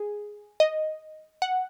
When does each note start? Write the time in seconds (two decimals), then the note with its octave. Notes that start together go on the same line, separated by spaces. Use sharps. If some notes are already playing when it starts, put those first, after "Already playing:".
Already playing: G#4
0.60 D#5
1.42 F#5